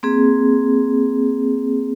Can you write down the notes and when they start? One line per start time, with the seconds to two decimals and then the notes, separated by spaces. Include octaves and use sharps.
0.03 A#3 C4 G#4